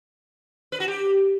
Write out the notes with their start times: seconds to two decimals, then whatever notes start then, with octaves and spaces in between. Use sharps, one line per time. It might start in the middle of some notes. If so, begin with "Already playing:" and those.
0.72 B4
0.80 F#4
0.88 G4